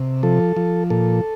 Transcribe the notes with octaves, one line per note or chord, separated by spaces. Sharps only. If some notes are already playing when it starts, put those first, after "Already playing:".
Already playing: C3
F3 A4
F3
A#2 A4